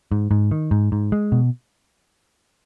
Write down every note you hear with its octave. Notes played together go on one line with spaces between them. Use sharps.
G#2
G#2
D#3
G#2
G#2
G#3
B2